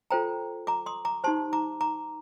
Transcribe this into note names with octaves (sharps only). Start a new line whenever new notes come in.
F4 A4 C5 G5 A#5
A#5 D6
C6 D#6
A#5 D6
D#4 G4 C5 A5 C6
A#5 D6
A#5 D6